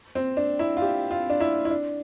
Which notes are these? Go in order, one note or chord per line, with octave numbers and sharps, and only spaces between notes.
C4
D4
E4
F4
G4
F4
D4
E4
E4
D4